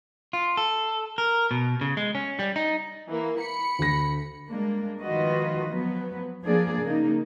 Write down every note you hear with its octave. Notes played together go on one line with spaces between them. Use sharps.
F4
A4
A#4
B2
C#3
G#3
C#4
G3
D#4
E3 A#3
B5 C#7
D2 A#6
G3 G#3 A#3 D4
D#3 F3 F4 F#4 B4 D#5
F3 F#3 B3 B4
F3 A#3 D4 G#4 D5
C#3 A#3 D#4